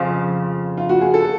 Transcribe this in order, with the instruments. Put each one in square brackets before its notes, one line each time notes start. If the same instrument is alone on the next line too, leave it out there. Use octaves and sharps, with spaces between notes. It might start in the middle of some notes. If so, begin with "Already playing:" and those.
Already playing: [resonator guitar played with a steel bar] F2 C#3 F3
[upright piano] F4
F#4
G#4
A4